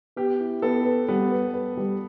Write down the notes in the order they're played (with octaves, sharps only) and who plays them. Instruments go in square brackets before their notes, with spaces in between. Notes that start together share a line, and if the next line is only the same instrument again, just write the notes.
[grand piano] B3 [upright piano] G4
[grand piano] E4
[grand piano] B3 [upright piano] A4
[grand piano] B4
[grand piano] G3 [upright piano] B3
[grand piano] B4
B4
G3